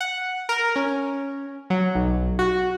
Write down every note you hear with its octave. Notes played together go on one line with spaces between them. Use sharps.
F#5
A#4
C#4
F#3
B1
F#4